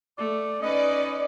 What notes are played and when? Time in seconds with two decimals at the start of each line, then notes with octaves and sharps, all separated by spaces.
0.18 A3 D5
0.63 C#4 D#4 B4 D5 D#5